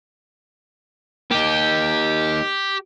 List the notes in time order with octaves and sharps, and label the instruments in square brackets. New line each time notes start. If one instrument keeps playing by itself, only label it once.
[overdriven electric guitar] A#3 D#4 [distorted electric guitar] G4